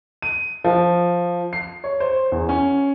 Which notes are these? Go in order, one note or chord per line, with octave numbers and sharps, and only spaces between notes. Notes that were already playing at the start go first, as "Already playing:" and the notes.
D#7
F3
C7
C#5
C5
E2
C#4